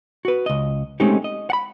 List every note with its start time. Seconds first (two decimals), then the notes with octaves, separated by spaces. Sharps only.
0.25 F#4 B4
0.46 C#2 D#5
1.00 G#3 A3 C4 C#4 D#4 G4
1.24 D#5
1.50 F#5 B5